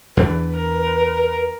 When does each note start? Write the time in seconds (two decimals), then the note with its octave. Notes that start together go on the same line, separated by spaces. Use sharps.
0.17 E2 E3 D4 B4
0.56 A#4